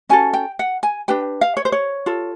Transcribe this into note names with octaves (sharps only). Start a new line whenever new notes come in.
C#4 F#4 A4 G#5
G5
F#5
G#5
D4 G4 B4 G5
F5
C#5
C5
C#5
F4 A4